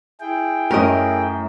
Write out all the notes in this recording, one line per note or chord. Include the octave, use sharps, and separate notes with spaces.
E4 G#4 G5
F#2 A3 A#4 D#5